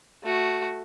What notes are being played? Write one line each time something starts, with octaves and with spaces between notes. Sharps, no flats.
A3 F#4